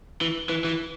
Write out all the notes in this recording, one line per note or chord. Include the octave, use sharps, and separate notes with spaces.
E3
E3
E3